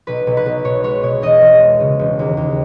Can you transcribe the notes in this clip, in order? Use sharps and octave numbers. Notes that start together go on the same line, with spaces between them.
B1 B4
B1
B4
B1
B2 C#5
G#3 C#5
B2 C#5
E1 D#5
E1
G#3
C#3
E1
D#2
D#2